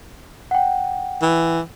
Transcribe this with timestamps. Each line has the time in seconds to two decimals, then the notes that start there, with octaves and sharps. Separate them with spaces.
0.51 F#5 G5
1.22 E3